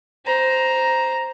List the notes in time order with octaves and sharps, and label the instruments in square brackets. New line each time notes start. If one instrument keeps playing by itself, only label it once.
[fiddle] C5 A#5